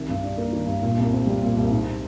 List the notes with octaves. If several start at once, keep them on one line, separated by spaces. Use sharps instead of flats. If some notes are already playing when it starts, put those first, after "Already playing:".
Already playing: C2 D#3
G2
D4
A#3
D#3
G2
A#2
C2
C4
G3
A#2
C2
G#2